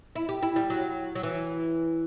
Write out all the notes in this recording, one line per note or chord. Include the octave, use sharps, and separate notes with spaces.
E4
G4
E4
G3
F#3
F#3
E3